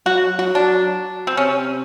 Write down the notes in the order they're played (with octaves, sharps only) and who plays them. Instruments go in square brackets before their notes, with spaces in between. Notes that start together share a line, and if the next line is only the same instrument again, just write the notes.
[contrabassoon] F#3 [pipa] F#4
[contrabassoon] F#3 [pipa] F#4
[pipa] D4
C4
[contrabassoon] C3 [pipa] C#4